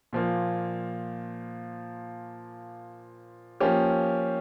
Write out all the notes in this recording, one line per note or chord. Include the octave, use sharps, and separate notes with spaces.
A#2 F3 A#3
F3 A#3 C#4 G4